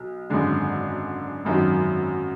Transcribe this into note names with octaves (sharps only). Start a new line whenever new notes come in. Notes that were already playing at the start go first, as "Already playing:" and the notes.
Already playing: B1
G#1 F#2 D3 G#3
G#1 F#2 D#3 F#3